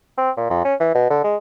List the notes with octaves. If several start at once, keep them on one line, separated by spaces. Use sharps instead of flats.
C4
A#2
F2
C#4
E3
B2
D3
G#3